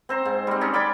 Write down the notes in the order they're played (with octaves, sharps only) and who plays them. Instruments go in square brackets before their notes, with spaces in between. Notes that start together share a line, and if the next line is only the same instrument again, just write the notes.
[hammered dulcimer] C4 C5 A#5
G#2
G3 C4
C#4 D#4 D5
C#5 D5 G5 B5